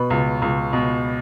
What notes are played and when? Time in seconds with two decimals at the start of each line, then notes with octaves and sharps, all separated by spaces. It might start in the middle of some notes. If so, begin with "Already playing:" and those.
Already playing: B2 B4 B5
0.10 C#2
0.42 C#2
0.73 B2